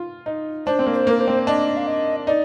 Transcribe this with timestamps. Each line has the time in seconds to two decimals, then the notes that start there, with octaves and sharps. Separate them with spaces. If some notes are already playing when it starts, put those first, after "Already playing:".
Already playing: F4
0.26 D#4
0.66 D4 C5
0.79 C4
0.87 A#3
0.93 C5
1.07 A#3 A#4
1.20 C5
1.27 C4
1.47 D4 D#5
1.77 F5
1.87 D#5
2.27 D#4 D5